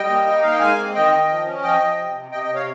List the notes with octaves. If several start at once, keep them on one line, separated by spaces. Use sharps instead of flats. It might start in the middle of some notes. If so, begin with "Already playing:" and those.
Already playing: G3 D#5 G5
A#3
D#4
A#3 F5
G5
G#3 F5 G#5
C4
D#3 D#5 G5
D#3
F3
C#4
F3 D#5 G5
F3
C3
C3
C3 D#5 G5
D#5 G5
C3
C#5 F5